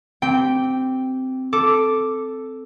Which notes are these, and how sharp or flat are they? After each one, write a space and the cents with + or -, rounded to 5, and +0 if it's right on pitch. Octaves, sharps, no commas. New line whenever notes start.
C4 -10 G4 -15 G5 +0
A4 +0 D6 +0